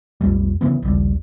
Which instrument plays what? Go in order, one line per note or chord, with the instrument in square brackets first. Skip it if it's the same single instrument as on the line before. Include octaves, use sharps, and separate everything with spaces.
[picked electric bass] B1 F2 G3
C#3 E3 B3
A#1 D#2 C#3 G3